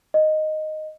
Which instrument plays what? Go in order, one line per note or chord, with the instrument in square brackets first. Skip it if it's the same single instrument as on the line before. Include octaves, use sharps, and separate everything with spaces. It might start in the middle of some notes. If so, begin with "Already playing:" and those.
[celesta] D#5